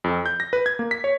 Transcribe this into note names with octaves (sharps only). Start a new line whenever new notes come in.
F2
G6
A#6
B4
G#6
A#3
B6
C#5